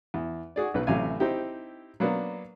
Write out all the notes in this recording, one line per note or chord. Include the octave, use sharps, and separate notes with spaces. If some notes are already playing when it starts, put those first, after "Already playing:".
E2
F#4 G#4 D5
B1 B2 B4
A1 C3 F#3 F5 G#5
C4 D#4 E4 G4
F#3 A#3 B3 D4